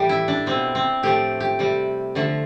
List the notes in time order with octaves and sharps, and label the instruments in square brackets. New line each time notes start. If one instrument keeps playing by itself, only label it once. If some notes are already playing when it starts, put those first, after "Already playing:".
Already playing: [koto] A2 E3 G3 G4
E4
D4
B2 G3 C4
C4
A2 F3 A3 G4
G4
C3 G3
D3 F3 A3